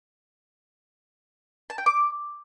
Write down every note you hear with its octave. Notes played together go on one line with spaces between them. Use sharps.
A5
G5
D6